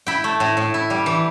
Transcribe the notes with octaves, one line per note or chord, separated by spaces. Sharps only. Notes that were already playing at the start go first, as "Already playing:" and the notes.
E4 G5 B5
A3
A2
A2
E4
G3
E3